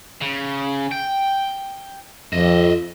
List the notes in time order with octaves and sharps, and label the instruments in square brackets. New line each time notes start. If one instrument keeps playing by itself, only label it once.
[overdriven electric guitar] C#3
G5
[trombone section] F2 [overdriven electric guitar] D#5 E5